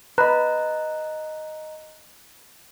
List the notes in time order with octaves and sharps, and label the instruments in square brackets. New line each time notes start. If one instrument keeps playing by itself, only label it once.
[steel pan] B4 [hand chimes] D#5 A#5 [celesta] F#6